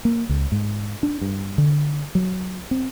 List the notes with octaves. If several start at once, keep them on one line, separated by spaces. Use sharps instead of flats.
A#3
C#2
G#2
D4
G2
D3
F#3
C4